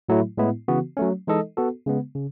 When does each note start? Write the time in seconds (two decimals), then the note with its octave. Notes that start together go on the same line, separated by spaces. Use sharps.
0.09 A2 F#3 A3 E4
0.37 A2 G#3 B3 E4
0.68 C#3 E3 B3 F#4
0.97 F#3 A3 C#4
1.28 E3 G#3 D#4 A4 D#5
1.57 B3 F#4 A4
1.86 C#3 G#3 B3
2.15 C#3